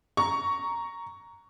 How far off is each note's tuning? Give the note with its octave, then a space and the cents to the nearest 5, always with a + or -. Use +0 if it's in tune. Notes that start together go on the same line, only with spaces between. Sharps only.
A#5 +0 C#6 +10